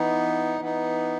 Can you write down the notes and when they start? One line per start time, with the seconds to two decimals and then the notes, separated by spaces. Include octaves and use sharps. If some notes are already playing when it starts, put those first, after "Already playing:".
Already playing: E3 B3 D#4
0.60 E3 B3 D#4